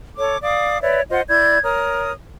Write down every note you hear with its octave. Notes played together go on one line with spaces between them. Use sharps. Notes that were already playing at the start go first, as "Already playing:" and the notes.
A4 C#5 D6
D5 F5 D6 D#6
B4 C#5 D5 E5
F4 C5 D#5 F#5
E4 D5 G6 G#6
A#4 C#5 D#6